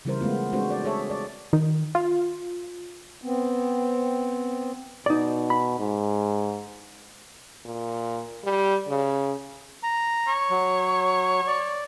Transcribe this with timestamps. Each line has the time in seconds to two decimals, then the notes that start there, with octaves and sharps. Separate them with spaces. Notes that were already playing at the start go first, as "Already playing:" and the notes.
0.05 C#3 E3 G3 E4 A#4 C5
0.21 G#3 A3 B3 F4
0.52 G#3 C4 D4 F#4 A4 C5
0.70 D5
0.84 G#4 A4 C#5 E5
1.10 D5
1.53 D#3
1.95 F4
3.22 B3 C4
5.06 B2 D#4 D5
5.50 B5
5.79 G#2
7.65 A#2
8.44 G3
8.89 C#3
9.83 A#5
10.28 C#5
10.50 F#3
11.47 D5